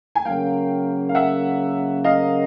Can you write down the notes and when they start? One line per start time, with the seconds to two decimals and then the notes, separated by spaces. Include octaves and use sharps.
0.15 G#5
0.25 C#3 F#3 A#3 F5 G5
1.09 F5
1.15 E5 F#5
2.04 D#5 F5